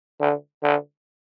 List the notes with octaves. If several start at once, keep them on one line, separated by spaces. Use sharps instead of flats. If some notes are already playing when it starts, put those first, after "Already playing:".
D3
D3